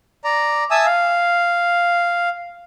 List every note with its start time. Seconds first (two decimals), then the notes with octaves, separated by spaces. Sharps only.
0.24 D5 A#5
0.71 E5 G#5 A5 D#6 E6
0.86 F5